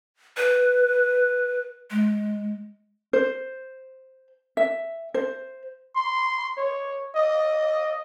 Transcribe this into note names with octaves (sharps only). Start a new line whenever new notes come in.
B4
G#3
C5
E5
C5
C6
C#5
D#5